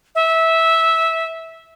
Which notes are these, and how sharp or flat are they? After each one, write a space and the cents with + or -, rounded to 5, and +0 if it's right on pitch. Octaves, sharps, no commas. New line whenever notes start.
E5 -15